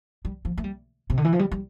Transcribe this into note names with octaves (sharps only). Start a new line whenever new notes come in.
G3
F3
A3
G3
C3
D3
E3
F3
G3
G3